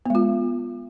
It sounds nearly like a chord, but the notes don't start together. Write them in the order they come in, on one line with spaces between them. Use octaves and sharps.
B3 G#3 F4